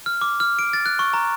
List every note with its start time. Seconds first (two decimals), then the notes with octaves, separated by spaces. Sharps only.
0.06 F6
0.21 D6
0.40 F6
0.59 D7
0.73 A6
0.86 F#6
0.99 C#6
1.14 A#5